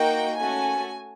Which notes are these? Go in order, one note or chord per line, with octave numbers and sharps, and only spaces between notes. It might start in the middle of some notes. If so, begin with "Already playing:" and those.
Already playing: A#3 D#4 F#4 G5
A3 C#4 F#4 A4 G#5